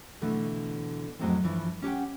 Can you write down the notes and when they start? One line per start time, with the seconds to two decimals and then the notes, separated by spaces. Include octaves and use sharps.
0.22 B2 D3 E3 A3
1.19 F2 A2 F#3 G#3 A3 C4
1.43 G2 E3 F3
1.82 C#4 G4 F#5 G5